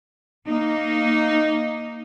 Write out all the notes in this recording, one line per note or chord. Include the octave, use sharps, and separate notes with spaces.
A#3 D#4